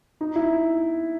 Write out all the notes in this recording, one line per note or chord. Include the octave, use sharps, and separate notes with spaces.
D#4
E4